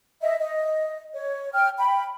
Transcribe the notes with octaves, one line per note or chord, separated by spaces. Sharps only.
D#5 E5
D#5
C#5
G5 F6
G5 B5